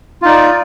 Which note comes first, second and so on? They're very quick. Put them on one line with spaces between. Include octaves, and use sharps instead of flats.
F4 D#4 D5